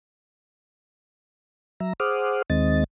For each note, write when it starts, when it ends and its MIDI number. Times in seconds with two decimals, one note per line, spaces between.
1.80 1.93 54
1.80 1.93 76
1.80 1.93 82
2.00 2.42 68
2.00 2.42 72
2.00 2.42 78
2.00 2.42 86
2.00 2.42 87
2.00 2.42 89
2.50 2.84 39
2.50 2.84 51
2.50 2.84 56
2.50 2.84 60
2.50 2.84 75
2.50 2.84 93